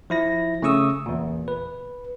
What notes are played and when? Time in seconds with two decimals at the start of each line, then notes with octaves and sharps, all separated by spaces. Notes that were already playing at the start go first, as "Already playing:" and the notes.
0.10 F3 E4 A#6
0.62 C#3 A3 C#4 C#6 D#6 E6
1.06 E2 A#2
1.48 B4